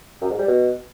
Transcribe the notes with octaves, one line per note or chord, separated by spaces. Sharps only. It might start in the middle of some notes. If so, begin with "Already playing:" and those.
F#2
G#2
G3
B2